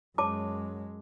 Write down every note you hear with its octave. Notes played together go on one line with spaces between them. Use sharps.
F#2 G#3 C#5 A5 D6